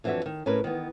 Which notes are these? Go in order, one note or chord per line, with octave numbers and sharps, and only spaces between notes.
F2 E3 F#3 D4 F#4 E5
D#3
A2 C#4 A#4 B4
D#3 E3 B3